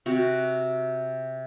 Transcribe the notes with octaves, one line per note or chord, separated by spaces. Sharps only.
C3 F#4